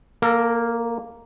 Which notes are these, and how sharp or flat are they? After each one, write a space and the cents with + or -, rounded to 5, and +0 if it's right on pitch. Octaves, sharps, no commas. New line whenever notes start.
A#3 +0 A4 +35